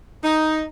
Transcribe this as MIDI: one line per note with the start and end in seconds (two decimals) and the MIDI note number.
0.24 0.62 63